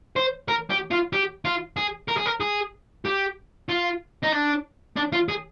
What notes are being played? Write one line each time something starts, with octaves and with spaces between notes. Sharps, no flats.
C5
A#4
G4
F4
G4
F4
G#4
A#4
G#4
A#4
G#4
G4
F4
D#4
D4
D4
F4
G#4